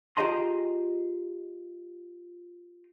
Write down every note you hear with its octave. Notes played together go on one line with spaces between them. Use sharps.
F4 G4 G#4 D#5 A#5 C6